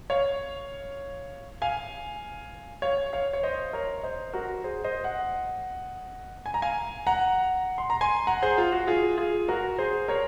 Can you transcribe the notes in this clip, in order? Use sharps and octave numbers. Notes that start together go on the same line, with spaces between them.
C#5 F5
F5 G#5
C#5 F5
C#5 F5
C#5
C5 D#5
A#4 C#5
C5 D#5
F#4 A#4
G#4 C5
C5 D#5
D#5 F#5
G#5
A#5
F5 G#5
F#5 A#5
C6
A#5
G#5 C6
F#5 A#5
G#4 C5
F4
F#4
F4 G#4
F4 G#4
F#4 A#4
G#4 C5
A#4 C#5